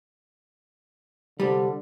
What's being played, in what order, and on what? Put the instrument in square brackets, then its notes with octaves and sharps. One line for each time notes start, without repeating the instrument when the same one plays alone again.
[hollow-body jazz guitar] C2 G3 [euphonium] D3